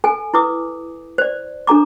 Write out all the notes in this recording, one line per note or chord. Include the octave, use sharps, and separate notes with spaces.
A4 G#5
E4 B4 D6 D#6
C5 D5
D4 A4 A#5 D6